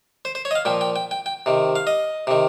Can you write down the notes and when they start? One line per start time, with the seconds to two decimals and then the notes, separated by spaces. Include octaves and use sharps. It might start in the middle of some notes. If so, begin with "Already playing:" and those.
0.25 C5
0.35 C5
0.45 C#5
0.51 D#5
0.55 F5
0.65 A#2 F3 G5
0.81 G5
0.96 G5
1.11 G5
1.26 G5
1.46 C3 D#3
1.76 F5
1.87 D#5
2.27 C3 D#3